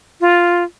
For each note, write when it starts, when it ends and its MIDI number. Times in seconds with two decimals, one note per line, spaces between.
0.21 0.64 65